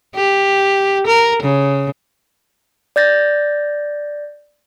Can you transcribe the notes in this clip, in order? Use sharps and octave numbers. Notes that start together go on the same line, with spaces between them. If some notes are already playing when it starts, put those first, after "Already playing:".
G4
A#4
C#3
D5 G6 A6 A#6